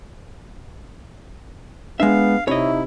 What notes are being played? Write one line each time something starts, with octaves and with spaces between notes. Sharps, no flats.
G#3 B3 D4 E5 F5
C3 D#4 E4 C#5 D#5